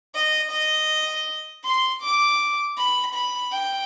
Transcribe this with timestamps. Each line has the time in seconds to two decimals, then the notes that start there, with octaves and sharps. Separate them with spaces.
0.15 D#5
0.51 D#5
1.65 C6
2.02 D6
2.78 B5
3.15 B5
3.53 G5